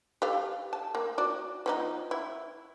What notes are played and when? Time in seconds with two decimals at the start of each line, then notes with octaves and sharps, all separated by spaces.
0.22 G4 A4 F5
0.73 A5
0.95 A#3
1.18 F#4 D5
1.66 F3 B3 D#4
2.11 E4